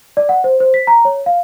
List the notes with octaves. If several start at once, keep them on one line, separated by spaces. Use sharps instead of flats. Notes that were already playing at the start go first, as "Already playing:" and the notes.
D5
F#5
C5
C5
B6
A#5
C#5
F5